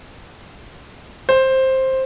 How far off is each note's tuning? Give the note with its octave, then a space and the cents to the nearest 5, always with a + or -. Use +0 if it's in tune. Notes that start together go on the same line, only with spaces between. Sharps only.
C5 +10